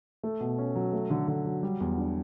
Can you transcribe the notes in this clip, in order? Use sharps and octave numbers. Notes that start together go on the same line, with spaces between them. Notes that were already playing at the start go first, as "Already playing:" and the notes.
A3
B2
C#4
F#3
A3
D3
D3
F#3
G3
E2
D4